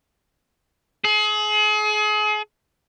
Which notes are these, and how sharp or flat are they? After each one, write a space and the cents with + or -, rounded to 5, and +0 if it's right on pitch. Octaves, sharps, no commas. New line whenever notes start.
G#4 +35